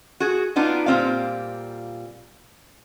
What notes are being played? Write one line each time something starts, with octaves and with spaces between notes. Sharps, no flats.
F#4 G#4
B3 D4 D#4 F4
A#2 G3 C4 F4 F5